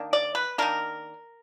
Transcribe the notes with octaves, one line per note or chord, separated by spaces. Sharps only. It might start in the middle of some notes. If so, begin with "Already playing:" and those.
Already playing: D#3 A#3 D4
D5
B4
D#3 A#3 D4 A#4